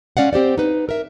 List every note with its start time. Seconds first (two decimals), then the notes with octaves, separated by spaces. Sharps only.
0.17 G#3 C#4 D5 F5 F#5
0.33 C4 G4 C5 D5
0.58 D#4 B4
0.89 A#4 E5